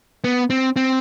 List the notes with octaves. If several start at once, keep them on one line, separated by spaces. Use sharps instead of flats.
B3
C4
C4